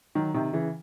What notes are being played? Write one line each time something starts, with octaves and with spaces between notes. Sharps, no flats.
D#3 F#3
C3 D#3
C#3 E3